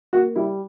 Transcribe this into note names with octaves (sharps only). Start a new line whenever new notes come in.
A#3 F#4
G3 E4